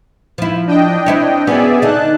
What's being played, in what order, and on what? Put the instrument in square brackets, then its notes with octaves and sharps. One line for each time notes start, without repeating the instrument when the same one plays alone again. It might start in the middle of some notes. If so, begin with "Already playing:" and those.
[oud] F3 E4
[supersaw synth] D4 D#5 G5
[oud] C4 E4 C#5
[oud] B3 C#4 F#4 [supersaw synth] G#4 D5 E5
[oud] D3 D#4 [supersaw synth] A5 F#6